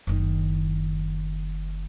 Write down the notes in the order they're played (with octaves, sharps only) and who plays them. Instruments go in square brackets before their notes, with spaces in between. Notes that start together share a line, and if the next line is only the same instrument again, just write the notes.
[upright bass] F#1 D#3